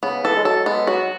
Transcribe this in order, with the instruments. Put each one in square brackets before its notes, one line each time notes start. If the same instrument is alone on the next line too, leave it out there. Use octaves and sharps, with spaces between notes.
[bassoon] C#3 [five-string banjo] B3
[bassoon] E3 [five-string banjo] A4
[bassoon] G#3
[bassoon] F#3 [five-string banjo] A4
[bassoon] G#3 [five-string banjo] B3
[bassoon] F#3 [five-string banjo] F#4